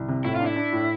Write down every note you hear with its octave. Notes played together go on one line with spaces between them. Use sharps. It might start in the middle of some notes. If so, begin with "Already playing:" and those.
Already playing: C2
C3
A2 E4
F4
D4
E4
D4
A2